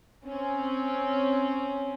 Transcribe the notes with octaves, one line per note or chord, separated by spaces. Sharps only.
C4 C#4